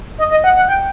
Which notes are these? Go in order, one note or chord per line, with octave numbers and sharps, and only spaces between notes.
D#5
D#5
F#5
F#5
G5